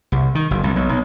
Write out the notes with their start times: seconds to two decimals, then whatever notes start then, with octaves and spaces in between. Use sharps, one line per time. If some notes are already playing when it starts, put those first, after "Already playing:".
0.12 C2
0.35 D#3
0.51 F#1
0.63 C2
0.76 B1
0.89 B1